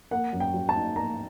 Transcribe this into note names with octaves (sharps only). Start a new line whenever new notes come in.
A#3 F#5
F#2
G5
F#3
A5
D#4
A#3 A#5